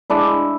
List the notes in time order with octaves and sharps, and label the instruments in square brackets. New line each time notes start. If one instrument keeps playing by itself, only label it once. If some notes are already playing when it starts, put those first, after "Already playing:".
[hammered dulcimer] G#3 D4 E4